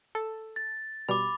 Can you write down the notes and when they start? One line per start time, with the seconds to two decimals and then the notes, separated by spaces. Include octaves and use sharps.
0.15 A4
0.56 A6
1.09 B2 G3 B5 D6